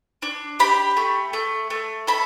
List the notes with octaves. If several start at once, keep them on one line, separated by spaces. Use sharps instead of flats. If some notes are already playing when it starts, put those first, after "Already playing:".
D4
G4 B5
A3
A3
A3
A4 B5